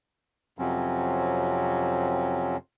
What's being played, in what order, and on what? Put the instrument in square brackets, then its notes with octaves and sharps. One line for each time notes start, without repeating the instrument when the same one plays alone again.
[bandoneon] F2 C3 F#3 C4 C#4